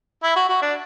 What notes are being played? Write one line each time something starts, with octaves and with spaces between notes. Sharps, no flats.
E4
F#4
F#4
D4